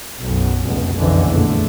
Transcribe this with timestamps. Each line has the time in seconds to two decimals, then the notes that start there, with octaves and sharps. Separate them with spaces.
0.21 B1 F#2
0.63 F1 C#2 B2
0.96 F#1 B1 F2 B2 D3 E3
1.32 E2 A#2 D3 A3